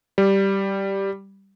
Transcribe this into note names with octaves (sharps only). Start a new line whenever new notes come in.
G3